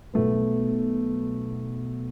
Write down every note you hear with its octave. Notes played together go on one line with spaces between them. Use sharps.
B1 A3 B3